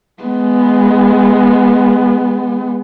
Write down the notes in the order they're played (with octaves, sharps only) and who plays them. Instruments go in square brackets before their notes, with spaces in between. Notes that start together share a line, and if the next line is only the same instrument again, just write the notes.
[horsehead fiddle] G#3 B3